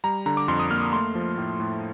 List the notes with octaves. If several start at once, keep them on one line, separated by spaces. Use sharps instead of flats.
G3 A#5
D3 A#5
D6
F2 C6
D#6
A#3 F6
D#6
A3 C6
F3
A2
A2